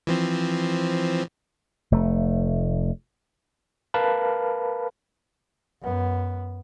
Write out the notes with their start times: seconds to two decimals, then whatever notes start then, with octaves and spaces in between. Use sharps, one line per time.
0.07 E3 F3 C4
1.92 F1 A3
3.94 A#4 B4 F5 A5 B5
5.82 F#2 B3